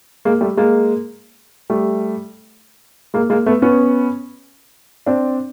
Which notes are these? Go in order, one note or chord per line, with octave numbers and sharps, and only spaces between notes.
G#3 A#3
G3 A3
G#3 A#3
G3 A3
G#3 A#3
G#3 A#3
A3 B3
B3 C#4
C4 D4